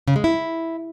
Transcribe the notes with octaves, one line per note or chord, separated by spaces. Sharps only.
C#3
G#3
E4